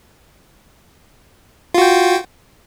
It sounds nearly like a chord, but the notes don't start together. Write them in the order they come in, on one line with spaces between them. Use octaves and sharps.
F4 F#4 G5